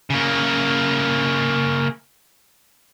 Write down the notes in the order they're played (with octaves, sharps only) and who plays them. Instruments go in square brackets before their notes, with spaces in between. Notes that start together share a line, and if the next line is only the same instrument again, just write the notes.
[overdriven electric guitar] C#3 A#3